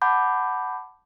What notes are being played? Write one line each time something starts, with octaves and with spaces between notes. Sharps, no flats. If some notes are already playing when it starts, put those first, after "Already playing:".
F#5 A5 B5 D6 G6